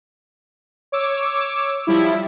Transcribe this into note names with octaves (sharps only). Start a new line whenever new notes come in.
C#5 D6 E6
F3 G3 E4